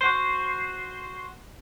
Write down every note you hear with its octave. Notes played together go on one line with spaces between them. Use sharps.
F#4 C5